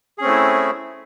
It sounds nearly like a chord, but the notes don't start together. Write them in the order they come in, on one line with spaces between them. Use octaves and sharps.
G#4 C#4 C4 A3 E4